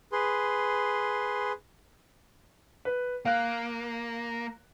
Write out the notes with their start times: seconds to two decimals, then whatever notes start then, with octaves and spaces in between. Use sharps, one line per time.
0.12 G#4 B4 C6
2.85 B4
3.25 A#3 F5 F#6